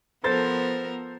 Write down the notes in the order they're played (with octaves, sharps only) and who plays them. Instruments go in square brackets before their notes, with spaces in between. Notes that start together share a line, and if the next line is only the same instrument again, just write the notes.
[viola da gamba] F3 B3 A#4 [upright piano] A4 C5 A6